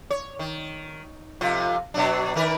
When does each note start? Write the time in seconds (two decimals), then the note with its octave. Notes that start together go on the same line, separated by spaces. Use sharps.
0.10 C#5
0.39 D#3
1.41 F2 C3 F4
1.94 B2 F#3 D4
2.35 D#3 A#4 B4